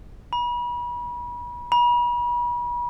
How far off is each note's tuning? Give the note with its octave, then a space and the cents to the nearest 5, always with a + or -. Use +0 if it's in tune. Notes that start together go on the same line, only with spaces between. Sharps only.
B5 -35
B5 -40